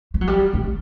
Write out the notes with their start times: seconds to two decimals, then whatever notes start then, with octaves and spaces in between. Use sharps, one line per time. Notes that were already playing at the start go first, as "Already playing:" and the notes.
0.14 A3
0.21 F#3
0.28 G3
0.53 A3